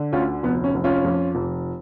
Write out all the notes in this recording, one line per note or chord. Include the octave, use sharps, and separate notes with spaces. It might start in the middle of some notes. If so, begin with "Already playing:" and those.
Already playing: D3
D2 C#4 F4
F1 B3
C#4
F1
C#4 F4
F2
F1